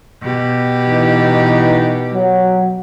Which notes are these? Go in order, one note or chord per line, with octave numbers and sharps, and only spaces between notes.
B2 G4
E3 D#4
F#3